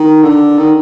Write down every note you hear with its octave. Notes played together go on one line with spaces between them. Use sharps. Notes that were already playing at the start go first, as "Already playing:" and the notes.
Already playing: D#3
D3
D#3